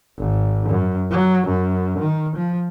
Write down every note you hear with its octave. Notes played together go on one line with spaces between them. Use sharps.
G#1
F#2
F#3
F#2
D#3
F3